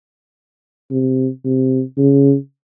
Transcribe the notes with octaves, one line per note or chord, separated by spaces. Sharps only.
C3
C3
C#3